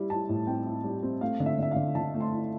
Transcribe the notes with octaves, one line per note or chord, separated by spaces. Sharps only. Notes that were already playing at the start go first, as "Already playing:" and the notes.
Already playing: G3 E4
E4 A5
A2
C4 G5
E4
G3
C4
A3 F5
D3
E5
D3 E5
D3 F5
D3 A5
A3
C6
E4